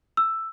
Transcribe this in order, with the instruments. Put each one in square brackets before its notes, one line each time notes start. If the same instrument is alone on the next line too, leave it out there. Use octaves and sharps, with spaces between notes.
[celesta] E6